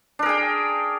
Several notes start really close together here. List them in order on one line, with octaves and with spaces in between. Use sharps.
D4 A#4 G#4 G5